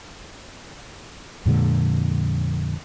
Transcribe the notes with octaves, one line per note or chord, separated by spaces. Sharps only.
F2 A#2 D3 G#3